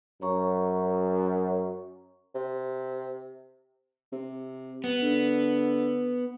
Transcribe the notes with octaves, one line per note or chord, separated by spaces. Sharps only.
F#2 C#5 A#5 C#6
C3
C3
B3
D3